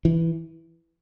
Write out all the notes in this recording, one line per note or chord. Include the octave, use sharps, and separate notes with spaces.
E3